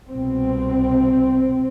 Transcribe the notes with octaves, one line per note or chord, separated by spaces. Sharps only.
C2 B2 C4